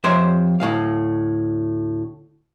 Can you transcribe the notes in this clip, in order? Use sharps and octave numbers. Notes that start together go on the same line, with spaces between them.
F2 G4 C5 C#5 E5 C6
D2 A2 E3 F5